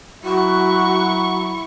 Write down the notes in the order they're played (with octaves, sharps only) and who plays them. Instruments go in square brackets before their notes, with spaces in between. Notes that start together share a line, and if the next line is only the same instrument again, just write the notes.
[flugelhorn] F#3 [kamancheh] E4 C#6 [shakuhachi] F#4